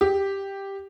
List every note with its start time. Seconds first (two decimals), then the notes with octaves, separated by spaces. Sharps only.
0.01 G4